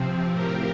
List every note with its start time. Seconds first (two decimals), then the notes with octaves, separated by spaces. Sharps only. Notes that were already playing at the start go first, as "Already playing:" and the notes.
Already playing: C3 F3 C4
0.32 A2 F3 C4 G4 A#4